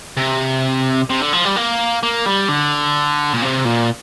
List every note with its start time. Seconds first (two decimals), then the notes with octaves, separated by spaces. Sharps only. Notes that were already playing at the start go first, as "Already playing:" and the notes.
0.17 C3
1.10 C3
1.21 D3
1.33 F3
1.45 G3
1.56 A#3
2.03 A#3
2.26 G3
2.49 D3
3.33 A#2
3.42 C3
3.65 A#2